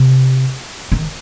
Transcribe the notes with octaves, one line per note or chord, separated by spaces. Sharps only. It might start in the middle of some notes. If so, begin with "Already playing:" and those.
Already playing: C3
D#3